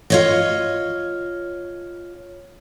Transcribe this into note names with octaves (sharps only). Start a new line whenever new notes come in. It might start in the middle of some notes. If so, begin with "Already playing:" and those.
F4 C#5 D#5